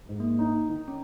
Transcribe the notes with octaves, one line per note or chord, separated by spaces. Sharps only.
G#2
A#3
D#4
D#3
C#4